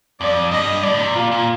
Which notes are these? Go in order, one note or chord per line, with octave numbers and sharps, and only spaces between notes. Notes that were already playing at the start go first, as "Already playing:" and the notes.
F2 D5
G2 D#5
A2 D5
C3
A#2 F4
A#2